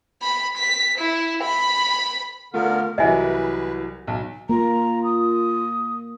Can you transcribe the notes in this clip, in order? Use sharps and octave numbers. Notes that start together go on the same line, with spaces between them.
B5
B6
E4
B5
D3 A3 B3 F4 A#4
C2 E3 F#3 B4 D#5 E5 G#5
B1
A#3 F4 A#5
D#6